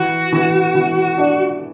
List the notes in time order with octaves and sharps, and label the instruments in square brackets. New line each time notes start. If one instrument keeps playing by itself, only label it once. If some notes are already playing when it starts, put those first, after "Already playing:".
Already playing: [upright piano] E3 [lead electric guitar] F#4
[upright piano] E3
E3
D4